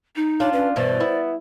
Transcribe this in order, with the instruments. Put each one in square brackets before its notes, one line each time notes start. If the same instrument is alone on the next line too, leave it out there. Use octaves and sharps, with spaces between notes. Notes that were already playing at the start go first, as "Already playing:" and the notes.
[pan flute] D#4
[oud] D4 [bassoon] F4 [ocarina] C#5
[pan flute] C#4 [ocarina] B4
[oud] G2 B2 E3 [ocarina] C5 [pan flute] D5
[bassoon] B3 [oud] E4